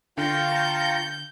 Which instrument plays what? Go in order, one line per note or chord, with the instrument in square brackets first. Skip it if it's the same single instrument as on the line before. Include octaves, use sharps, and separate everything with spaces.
[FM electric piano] D3 [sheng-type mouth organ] F4 F5 G5 [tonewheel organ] A5 A#5 C#6 [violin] G6